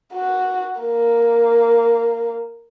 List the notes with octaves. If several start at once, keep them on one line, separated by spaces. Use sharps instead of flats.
F#4
A#3